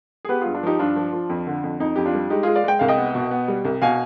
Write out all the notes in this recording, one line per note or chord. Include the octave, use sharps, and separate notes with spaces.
G#4
B3 G4 B4
G2 F4 G#4
D4 F4
F3 D#4 G4
G2 D4 F4
F3
F3
F2
D3
F2
F2 D#4
F2 G4
D4 F4
G3
G#3 D#4 G4
G#3 F4 G#4
D5 F5
G#3 G5
C2 F5
D#5 G5
B3
B2
B3
G3
C2
B2 F5 G#5